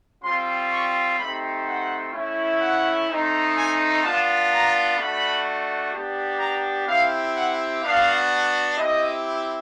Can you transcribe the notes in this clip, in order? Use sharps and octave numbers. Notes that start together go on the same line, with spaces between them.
G3 C4 F4 C6
C#6
A3 C4 D#4 G4 B5
F#5
A3 C#4 E4
F#5
A3 C4 D#4
G#5
B3 D4 F4 A5
A#5
A3 D4 F#4 B5
B3 D4 G4
A#5
C4 E4 G4 F5
F#5
B3 D4 F#4 F5
C4 E4 G4 D#5